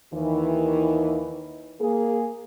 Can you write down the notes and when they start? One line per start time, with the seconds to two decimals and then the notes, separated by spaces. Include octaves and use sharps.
0.14 D#2 D#3 E3
1.81 A#3 G#4